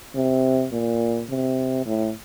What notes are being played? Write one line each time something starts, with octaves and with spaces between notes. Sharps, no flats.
C3
A#2
C3
A2